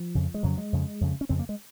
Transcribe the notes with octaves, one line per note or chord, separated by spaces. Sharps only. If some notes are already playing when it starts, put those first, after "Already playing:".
Already playing: F3
F2 C#3
G#3
F2 C#3 F#3
G#3
F2 C#3
F2 C#3
C#4
F2 C#3 C4
A#3
G#3